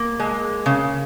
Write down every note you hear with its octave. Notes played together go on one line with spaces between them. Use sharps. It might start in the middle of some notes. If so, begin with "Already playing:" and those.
Already playing: A#3
G#3
C#3